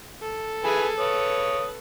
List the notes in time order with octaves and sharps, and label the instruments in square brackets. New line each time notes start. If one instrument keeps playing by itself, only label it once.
[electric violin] A4
[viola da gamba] G#4 [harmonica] B4 G#5 B5
[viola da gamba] B4 [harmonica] C#5 D#6